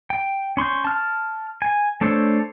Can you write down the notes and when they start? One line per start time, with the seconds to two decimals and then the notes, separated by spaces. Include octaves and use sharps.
0.10 G5
0.57 C#4 C6 C#6 G6
0.84 A5 F6
1.62 G#5
2.01 A3 D4 A4 C5 C#5